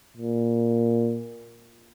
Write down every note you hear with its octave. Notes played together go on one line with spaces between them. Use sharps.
A#2